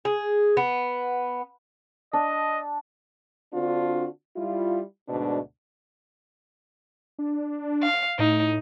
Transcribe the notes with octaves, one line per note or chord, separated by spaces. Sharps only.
G#4
B3
D4 D#5
D3 C4 D4 F4 F#4
G3 E4 F4
D2 G#2 B2 D4
D4
F5
A2 D#4